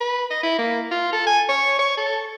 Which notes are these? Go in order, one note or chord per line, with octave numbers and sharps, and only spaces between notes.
B4
D#5
E4
A#3
F4
A4
G#5
C#5
C#5
A4